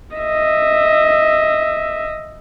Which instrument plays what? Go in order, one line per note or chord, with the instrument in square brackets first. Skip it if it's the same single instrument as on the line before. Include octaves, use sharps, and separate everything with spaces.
[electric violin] D#5 E5